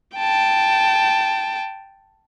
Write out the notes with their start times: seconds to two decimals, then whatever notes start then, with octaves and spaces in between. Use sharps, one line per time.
0.17 G5 A5